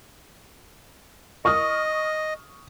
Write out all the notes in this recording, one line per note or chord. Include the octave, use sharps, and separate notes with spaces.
D#5 C#6 D#6 F6